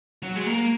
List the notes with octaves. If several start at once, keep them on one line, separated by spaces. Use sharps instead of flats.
F#3
G#3
A#3